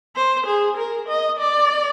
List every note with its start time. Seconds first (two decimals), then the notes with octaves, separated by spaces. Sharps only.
0.16 C5
0.46 G#4
0.77 A#4
1.09 D#5
1.39 D5